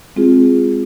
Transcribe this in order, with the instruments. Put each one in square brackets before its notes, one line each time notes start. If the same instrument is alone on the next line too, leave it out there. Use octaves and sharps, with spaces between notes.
[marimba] G#3 C4 F4 G#4